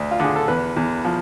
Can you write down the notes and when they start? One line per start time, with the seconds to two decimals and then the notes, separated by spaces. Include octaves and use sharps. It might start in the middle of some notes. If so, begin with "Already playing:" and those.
Already playing: D2
0.11 F4
0.20 D3 G#4
0.36 A4
0.48 E2 B4
0.77 E2
1.05 F3